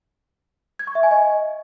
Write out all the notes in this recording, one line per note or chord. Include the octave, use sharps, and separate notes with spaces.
G#6
C#6
E5
G#5
D#5